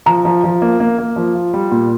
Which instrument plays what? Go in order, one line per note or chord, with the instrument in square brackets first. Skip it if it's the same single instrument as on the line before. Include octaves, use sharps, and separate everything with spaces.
[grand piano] F3 [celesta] A#5
[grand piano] F3
F3
A#3
A#3
A#3
F3
F4
G3
A#2